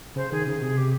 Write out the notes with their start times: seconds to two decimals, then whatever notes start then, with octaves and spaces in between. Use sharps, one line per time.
0.16 C#3 C5
0.32 D#3 G#4
0.46 C#3 G#4
0.61 C3 G#4
0.77 G4